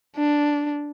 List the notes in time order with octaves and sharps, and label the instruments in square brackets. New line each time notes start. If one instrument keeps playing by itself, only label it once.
[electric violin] D4